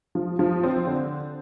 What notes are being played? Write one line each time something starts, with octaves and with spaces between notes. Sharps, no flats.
F3
F3
C4
D3